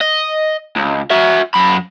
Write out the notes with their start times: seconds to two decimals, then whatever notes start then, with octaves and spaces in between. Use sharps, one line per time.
0.01 D#5
0.76 C#2
1.11 F#4 E5
1.54 F#2 B5